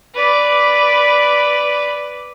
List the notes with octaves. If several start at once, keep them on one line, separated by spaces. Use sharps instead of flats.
B4 D5